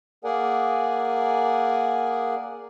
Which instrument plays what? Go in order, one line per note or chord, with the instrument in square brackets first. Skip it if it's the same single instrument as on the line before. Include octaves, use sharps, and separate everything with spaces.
[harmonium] A#3 G#4 A#4 D5 F#5 G#5